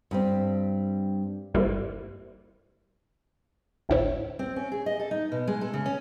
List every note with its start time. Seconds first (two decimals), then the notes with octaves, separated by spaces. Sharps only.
0.11 G2 G3 C4
1.54 G1 G3 A#3 C4 E4
3.89 G#1 D2 A2 E4 C5 C#5
4.39 C4
4.56 C#4
4.72 G#4
4.86 D#5
5.00 A4
5.11 D#4
5.32 B2
5.47 G#3
5.61 A4
5.73 C#3
5.86 C#4